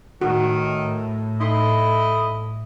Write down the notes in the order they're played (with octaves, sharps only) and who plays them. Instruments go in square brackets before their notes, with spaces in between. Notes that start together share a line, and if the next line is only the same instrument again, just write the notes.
[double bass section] A2 [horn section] D#3 [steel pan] F#4
[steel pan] D#4 B5 C6 [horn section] E4 A4 D#5